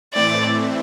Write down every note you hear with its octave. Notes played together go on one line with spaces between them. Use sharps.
A2 E3 A3 C4 E4 D5